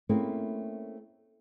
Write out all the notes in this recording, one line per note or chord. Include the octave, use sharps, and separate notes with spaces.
A3 A#3 C4 C#4 E4 G#4